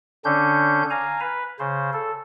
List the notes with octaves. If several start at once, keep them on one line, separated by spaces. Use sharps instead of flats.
D3 C#4 D4 G6
F5 G#5 A#5
B4
C#3 C5
A4